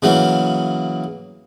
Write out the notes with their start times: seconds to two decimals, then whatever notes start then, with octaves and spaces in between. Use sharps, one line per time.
0.02 C#3 E3 F#3 A#3